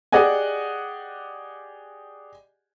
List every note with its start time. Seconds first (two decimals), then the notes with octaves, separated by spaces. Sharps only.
0.12 G4 G#4 D5 D#5 F#5 G#5